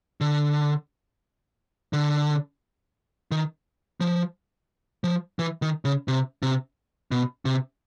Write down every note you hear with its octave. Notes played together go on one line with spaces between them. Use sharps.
D3
D3
D#3
F3
F3
E3
D#3
C#3
C3
C3
B2
C3